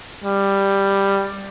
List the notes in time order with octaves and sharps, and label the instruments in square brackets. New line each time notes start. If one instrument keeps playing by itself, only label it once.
[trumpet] G3